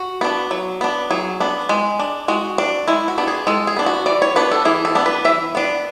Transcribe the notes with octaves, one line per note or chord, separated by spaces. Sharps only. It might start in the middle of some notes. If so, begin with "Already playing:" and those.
Already playing: F#4
B3 D4
F#3
B3 D4
F#3 G#4
B3 D4
G#3
D4
G#3 F#4
D4
G#3 E4
F#4
B3 D4
G#4
G#3 A4
G#4
B3 D4
F#4
E3 D5
C#5
B3 D4 B4
A4
E3 G#4
A4
B3 D4
B4
E3 E5
B3 D4